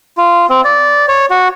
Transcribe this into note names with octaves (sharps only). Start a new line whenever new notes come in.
F4
C4
D5
C#5
F#4